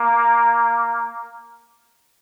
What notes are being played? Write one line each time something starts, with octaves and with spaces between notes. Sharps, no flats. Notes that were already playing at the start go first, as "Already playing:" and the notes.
Already playing: A#3